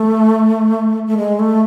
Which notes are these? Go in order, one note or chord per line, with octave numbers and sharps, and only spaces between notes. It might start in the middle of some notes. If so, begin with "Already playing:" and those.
Already playing: A3
A3
G#3
A3